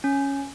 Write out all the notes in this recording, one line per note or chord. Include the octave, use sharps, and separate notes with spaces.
C#4